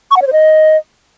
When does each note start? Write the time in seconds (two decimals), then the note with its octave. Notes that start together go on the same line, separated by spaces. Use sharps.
0.11 C#6
0.16 F#5
0.22 C#5
0.27 C5
0.32 D#5